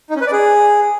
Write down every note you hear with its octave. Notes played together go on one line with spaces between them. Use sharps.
D#4
C#4
B4
D5
G#4